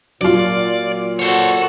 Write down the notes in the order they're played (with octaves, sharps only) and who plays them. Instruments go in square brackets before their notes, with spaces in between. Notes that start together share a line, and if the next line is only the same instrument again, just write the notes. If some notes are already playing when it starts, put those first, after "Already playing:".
[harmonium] A#2 [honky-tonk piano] F#3 F4 [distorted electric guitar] D5
[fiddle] F#4 A4 [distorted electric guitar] C5 C#5